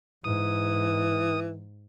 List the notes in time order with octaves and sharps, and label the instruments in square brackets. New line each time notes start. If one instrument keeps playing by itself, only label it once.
[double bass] G#2 [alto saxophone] E3 [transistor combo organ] D#6